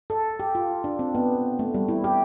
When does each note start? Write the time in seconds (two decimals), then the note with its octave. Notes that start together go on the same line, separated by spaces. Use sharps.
0.10 A4
0.40 G4
0.55 F4
0.84 D4
0.99 C4
1.15 B3
1.59 A3
1.74 G3
1.89 E4
2.04 G4